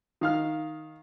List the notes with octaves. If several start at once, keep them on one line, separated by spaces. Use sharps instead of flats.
D#3 F5 F6